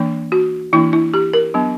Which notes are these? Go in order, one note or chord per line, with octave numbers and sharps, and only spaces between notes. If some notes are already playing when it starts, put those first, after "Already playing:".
Already playing: E3 A#3 D4
F#4
E3 A#3 D4 E4
E4
G4
A#4
F#3 B3 D4